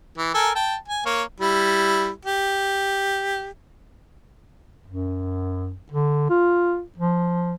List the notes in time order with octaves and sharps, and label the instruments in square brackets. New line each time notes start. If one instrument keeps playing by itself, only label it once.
[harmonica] E3
A4 A#4 G#5
G5 A5
G#5
A#3 C#5
G3 E4
G4
[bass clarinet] F#2
D3
F4
F3